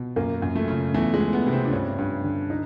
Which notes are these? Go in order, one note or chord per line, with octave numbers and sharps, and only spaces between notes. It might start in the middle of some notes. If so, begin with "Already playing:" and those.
Already playing: B2
F#2 A#3
F#2
A3
C#3
E2 A3
G#3
E2
B3
C3
C4
D4
G2 C#4
G2
D3
D#4